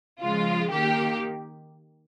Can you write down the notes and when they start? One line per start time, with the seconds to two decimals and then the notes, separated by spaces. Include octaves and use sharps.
0.22 C#3 F3 G#3 F4
0.71 D#3 A#3 G4